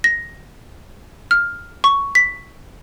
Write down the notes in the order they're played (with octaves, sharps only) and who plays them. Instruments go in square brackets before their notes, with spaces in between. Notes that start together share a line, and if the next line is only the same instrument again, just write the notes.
[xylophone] A#6
F6
C#6
B6